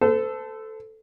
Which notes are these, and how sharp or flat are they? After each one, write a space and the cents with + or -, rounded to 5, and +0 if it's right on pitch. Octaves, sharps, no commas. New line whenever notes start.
A4 +0 C5 -40